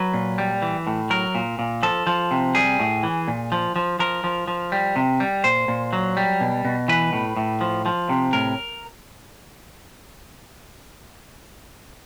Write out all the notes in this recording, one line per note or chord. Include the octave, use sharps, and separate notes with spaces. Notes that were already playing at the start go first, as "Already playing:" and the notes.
Already playing: F#3 B4
A#2
G3
E3
A2
F#3 A#4
A#2
A#2
F3 A4
F3
C3
G3 G#4
A2
E3
A#2
F3
F3
F3 A#4
F3
F3
G3
C3
G3
A#2 C5
A#2
F#3
G3
B2
B2
E3 B4
A2
A2
F3
F3
C3
A2 A#4